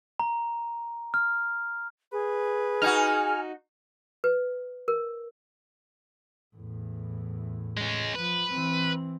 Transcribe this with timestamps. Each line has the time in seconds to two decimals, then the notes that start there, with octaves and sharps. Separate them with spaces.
0.19 A#5
1.14 F6
2.13 G#4 B4
2.82 D#4 F#4 G#5 F6
4.24 B4
4.88 A#4
6.56 E2 A2
7.77 G#3 C#4
8.15 F3 B4
8.53 E3 C4